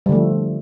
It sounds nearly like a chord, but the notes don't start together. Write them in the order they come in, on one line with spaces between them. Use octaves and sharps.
G3 D3 A3 F3